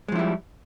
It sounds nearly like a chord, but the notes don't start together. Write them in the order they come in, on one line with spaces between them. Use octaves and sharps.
G#3 F3 E4 G3